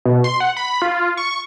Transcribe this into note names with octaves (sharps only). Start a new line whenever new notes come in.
B2
C6
F#5
B5
F4
C#6